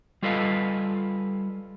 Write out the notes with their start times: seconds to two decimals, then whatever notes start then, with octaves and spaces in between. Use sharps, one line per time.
0.22 G3 F4 A4 B4 D#5 F5